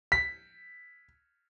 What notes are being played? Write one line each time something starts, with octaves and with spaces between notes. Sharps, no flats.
B6